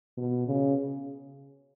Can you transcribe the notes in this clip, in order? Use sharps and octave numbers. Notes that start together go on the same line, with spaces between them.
B2
C#3